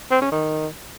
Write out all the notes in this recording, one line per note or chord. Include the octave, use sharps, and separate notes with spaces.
C4
C#4
D#3